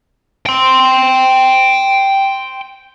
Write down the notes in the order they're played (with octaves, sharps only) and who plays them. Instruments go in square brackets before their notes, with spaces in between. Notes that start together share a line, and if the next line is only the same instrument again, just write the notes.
[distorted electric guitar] G5 C6